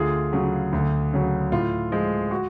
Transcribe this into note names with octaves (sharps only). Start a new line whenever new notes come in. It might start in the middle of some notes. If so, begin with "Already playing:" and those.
Already playing: D2 F4 G#4
C#3 F#3
D2
C#3 F#3
A2 F4
F3 G#3
F#4